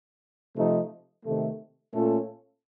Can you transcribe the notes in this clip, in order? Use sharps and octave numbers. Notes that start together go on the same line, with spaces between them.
C3 F3 A3 D#4
C3 D#3 A3
A#2 A3 C#4 F4 A4